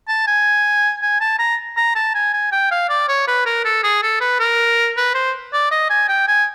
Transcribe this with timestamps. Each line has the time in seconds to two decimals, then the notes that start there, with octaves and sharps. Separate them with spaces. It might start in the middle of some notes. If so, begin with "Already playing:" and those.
0.08 A5
0.27 G#5
1.02 G#5
1.21 A5
1.39 A#5
1.77 A#5
1.95 A5
2.15 G#5
2.33 G#5
2.52 G5
2.71 F5
2.89 D5
3.08 C#5
3.28 B4
3.46 A#4
3.65 A4
3.83 G#4
4.02 A4
4.21 B4
4.39 A#4
4.97 B4
5.14 C5
5.53 D5
5.71 D#5
5.90 G#5
6.08 G5
6.28 G#5